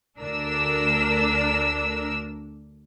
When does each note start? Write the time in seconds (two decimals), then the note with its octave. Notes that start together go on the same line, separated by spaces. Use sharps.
0.20 D2 D4 A#4 E6